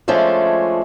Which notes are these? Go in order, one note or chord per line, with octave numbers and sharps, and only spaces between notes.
F3 G#3 A3 C#4 D4